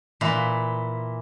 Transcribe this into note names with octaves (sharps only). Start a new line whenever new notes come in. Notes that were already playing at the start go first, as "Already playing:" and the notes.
A#2 E3